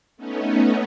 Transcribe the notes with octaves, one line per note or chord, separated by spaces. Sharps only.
A3 B3 C#4 D#4